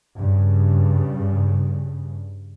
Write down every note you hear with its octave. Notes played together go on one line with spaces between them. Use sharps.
G2 C#3